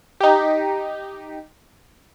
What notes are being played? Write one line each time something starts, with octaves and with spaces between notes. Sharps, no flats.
D#4 G4